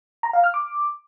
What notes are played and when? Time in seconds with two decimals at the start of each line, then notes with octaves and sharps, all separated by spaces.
0.23 A#5
0.33 F5
0.44 F6
0.54 D6